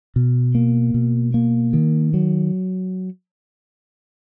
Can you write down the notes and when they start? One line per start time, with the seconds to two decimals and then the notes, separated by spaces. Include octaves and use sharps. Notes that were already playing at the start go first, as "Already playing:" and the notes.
0.16 B2
0.55 A#3
0.94 B2
1.34 A#3
1.73 D#3
2.14 F#3